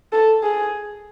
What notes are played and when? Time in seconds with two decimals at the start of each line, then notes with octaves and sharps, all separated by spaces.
0.13 A4
0.43 G#4